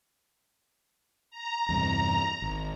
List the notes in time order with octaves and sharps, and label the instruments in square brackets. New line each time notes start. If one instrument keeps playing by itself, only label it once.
[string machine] A#5
[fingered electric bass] E2 G2 C3
G#1